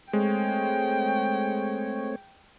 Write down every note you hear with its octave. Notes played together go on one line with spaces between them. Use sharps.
G#3 A3 C4 C#5 G5